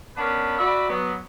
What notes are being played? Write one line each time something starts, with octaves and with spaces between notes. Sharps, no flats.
B3 C#4 D4 A#4 B4
F#4 D5 E5 B5
F#3 B3